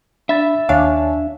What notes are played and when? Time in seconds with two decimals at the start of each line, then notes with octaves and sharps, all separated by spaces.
0.29 D4 E5 B5 A6
0.69 D#2 D4 C#5 F5 G#5